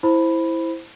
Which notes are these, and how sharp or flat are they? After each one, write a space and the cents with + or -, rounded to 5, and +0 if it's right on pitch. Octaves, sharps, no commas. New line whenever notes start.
E4 +0 C5 +0 B5 +0